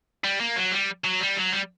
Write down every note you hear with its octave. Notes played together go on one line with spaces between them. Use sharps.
G3
A#3
F#3
G3
F#3
G3
F#3
G3